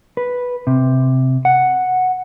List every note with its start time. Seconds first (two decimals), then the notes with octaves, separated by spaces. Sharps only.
0.17 B4
0.67 C3
1.45 F#5